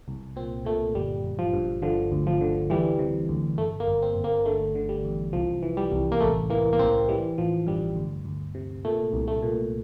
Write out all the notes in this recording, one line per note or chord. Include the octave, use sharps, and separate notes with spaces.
C2
A#2 C4
A#2 A3
G1 G3
G1
F3
G2
D3 F3
D2
F3
D3
E3 G3
C3
D2
G1 A3
A#3
G1
C4
G1
A#3
D3 A3
D3
G3
E2
C2 F3
E3
G3
C2
A#3
A1 A3
E3 A#3
A#3
A1 C4
E3 G3
A1 F3
G2 G3
D2
D2
C3
A#2 A3
C2
A3
A#2